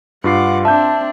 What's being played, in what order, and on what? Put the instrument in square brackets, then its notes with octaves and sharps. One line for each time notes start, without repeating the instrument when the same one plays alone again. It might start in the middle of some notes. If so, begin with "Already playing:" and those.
[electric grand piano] G2 F4 C7 [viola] F#5 D6
[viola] C4 D4 [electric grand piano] E5 G6 [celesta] A5